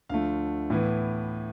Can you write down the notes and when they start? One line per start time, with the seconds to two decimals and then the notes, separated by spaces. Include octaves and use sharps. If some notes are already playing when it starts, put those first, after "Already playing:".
0.09 D2 D3 F3 A3 F5
0.70 A2 E3 B3